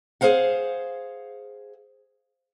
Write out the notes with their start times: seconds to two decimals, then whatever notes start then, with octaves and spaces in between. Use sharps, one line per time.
0.21 G#4 A#4 C5 F5 F#5